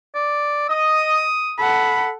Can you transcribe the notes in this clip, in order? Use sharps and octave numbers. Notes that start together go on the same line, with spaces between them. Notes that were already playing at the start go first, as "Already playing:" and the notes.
D5
D#5 D#6
A4 F#5 B5